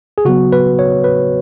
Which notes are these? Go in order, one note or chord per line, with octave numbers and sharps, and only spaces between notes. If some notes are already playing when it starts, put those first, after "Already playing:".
G#4
C#3 F#3 B3 F#4
B4
C#5
B4